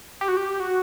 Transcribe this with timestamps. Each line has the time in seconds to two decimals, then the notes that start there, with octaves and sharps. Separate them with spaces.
0.21 G4
0.28 F#4
0.37 G4
0.60 F#4